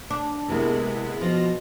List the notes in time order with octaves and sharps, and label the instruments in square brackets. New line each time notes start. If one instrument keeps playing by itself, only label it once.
[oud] D4
[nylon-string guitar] C3 A#3 [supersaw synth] G#3 B3 E4
[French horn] B2 [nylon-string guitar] F3 [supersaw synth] F4 A#6